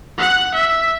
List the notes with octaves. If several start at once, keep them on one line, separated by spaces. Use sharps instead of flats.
F#5
E5